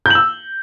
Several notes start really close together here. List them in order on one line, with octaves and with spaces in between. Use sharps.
G6 F#7 E6